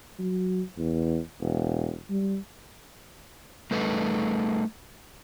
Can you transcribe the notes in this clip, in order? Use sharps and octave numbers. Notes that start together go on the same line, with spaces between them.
F#3
E2
E1
G3
G3 A3 D#4 A4 B4 D#5